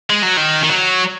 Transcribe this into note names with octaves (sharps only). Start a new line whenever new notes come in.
G#3
F#3
D#3
D#3
F#3